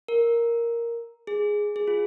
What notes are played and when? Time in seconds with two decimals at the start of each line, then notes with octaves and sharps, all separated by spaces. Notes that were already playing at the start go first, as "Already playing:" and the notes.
0.08 A#4
1.27 G#4
1.76 G#4
1.88 F4